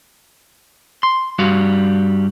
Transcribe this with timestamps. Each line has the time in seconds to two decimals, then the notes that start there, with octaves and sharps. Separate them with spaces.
1.03 C6
1.39 G2 G3 F#4 F5